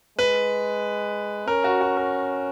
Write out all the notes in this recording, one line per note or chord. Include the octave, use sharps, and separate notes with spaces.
G#3 B4
C#4 A#4
F#4
F#4
A#4